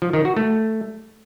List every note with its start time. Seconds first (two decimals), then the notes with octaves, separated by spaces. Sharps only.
0.02 F3
0.13 D#3
0.25 F#4
0.37 A3